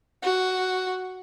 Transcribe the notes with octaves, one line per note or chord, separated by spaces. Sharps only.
F#4